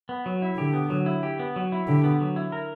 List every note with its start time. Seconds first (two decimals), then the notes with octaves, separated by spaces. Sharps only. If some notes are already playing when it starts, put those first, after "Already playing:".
0.09 B3
0.26 F#3
0.42 E4
0.57 D3 G4
0.74 B3
0.90 F#3
1.06 E4
1.23 G4
1.39 B3
1.56 F#3
1.72 E4
1.88 D3 G4
2.04 B3
2.20 F#3
2.36 E4
2.52 A#4